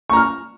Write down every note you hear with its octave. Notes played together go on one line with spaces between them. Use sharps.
A#5 C#6 F6